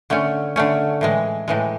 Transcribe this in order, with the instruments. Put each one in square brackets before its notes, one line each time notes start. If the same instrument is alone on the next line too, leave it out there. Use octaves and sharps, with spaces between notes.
[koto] D3 A3 C#4
D3 A3 C#4
A2 E3 G#3
A2 E3 G#3